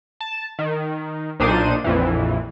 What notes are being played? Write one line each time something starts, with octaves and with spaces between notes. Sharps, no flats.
A5
D#3
B1 A#2 D4 D#4 C5 D#7
A#1 F2 E3